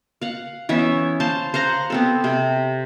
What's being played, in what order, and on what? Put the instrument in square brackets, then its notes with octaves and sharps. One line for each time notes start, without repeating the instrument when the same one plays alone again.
[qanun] F5 F#5
E3 B3 C#4 E5
C5 F5 A5
C5 F5 F#5 A#5
B3 C4 A4
C3